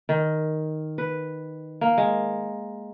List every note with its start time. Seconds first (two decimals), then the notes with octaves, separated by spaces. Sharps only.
0.09 D#3
0.98 B4
1.81 A#3
1.98 G#3